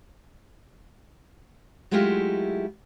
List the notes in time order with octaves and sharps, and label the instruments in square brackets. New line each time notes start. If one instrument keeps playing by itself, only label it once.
[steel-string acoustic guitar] F#3 G#3 A3 E4 F4 G4